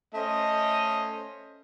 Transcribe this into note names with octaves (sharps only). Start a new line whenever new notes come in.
A3 C#4 C5 D#5